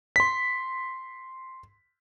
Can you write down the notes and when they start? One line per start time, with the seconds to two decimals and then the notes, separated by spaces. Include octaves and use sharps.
0.16 C6 B6